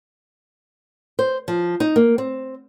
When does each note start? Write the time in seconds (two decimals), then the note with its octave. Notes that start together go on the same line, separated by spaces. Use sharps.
1.19 C5
1.48 F3
1.80 D#4
1.96 A#3
2.18 C4